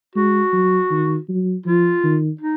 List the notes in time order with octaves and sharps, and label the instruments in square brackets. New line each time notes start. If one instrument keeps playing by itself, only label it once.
[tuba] G#3 [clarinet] F#4
[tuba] F#3
D#3
F#3
[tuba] F3 [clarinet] F4
[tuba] D#3
[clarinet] D#4